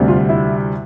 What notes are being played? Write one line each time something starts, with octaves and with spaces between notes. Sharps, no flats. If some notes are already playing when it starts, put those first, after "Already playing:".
Already playing: D2 C3 G3
F4
E4